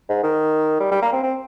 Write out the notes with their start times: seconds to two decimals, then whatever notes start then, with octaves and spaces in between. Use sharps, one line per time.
0.09 G#2
0.23 D#3
0.80 G3
0.91 G3
1.02 A#3
1.13 C4
1.23 C4